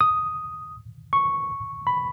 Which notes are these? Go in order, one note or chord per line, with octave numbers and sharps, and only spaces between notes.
D#6
C#6
B5